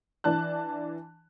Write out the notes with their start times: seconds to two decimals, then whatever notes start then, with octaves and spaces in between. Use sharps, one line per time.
0.24 E3 D4 A5 F#6